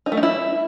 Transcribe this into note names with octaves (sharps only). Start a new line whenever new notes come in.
D#4
A3
D#4
E4